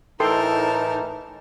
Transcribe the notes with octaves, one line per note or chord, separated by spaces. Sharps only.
A2 E3 D#4 A4 A#4 G5 A5 C6